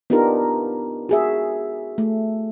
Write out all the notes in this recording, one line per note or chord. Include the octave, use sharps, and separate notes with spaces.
B3 D4 D#4 F4 G4 A#4
F#4 G#4 E5
A3